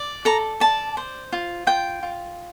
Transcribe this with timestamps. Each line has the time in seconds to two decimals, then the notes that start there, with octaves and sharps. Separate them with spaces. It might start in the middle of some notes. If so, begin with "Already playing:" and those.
Already playing: D5
0.25 A4 A#5
0.60 D5 A5
0.97 C5
1.32 F4
1.67 F4 G5
2.03 F4